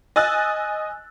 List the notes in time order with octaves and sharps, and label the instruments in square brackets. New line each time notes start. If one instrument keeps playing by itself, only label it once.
[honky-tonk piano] D#5 G#5 E6 F#6 A6